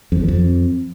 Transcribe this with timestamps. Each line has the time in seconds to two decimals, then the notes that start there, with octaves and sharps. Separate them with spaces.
0.12 F2
0.20 E2
0.28 F2